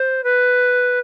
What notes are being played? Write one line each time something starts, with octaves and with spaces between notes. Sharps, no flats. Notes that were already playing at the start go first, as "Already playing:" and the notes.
Already playing: C5
B4